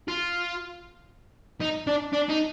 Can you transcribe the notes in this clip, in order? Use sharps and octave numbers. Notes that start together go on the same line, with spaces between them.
F4
D#4
D4
D4
D#4